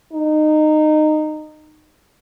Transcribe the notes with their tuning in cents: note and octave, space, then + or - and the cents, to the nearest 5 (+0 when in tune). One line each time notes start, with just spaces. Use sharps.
D#4 -20